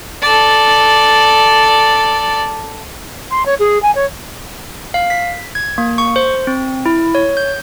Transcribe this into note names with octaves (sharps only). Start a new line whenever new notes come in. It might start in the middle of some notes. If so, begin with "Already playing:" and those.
A4 D5
C6
C#5
G#4
G#5
C#5
F5
B6
G#6
A#3
C#6
C5
C4
E4
C#5
G6